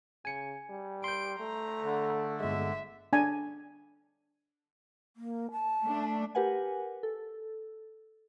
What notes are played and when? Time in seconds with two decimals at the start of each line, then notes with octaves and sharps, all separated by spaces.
0.25 C#3 G#5 C#7
0.69 G3
1.04 C6 G6 D7
1.39 A3 A#5
1.82 D3
2.40 G1 G#3 E5
3.13 D4 G#5
5.17 A#3
5.52 A5
5.84 A3 D4
6.35 G4 A#4 B4 F#5 G#5
7.03 A4